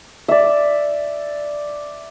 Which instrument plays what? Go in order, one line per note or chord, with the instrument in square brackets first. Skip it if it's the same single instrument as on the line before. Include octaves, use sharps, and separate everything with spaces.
[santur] D5 E5